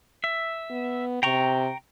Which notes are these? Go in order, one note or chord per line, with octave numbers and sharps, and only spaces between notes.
E5
B3
C3 G5 A#5 C#6